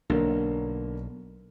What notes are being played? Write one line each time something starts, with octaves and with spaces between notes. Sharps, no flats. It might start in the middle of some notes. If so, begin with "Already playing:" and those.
B1 D3 A#3